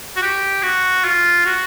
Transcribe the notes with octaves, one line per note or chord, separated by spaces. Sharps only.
F#4
G4
F#4
F4
F#4